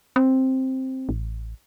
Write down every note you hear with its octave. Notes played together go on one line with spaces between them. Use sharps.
C4
A1